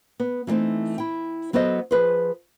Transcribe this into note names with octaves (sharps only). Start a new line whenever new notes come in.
B3
E3 G3 A3 C4 D#4
E4 G5
F#3 B3 A4 C5 D#5
F3 G#4 B4 C5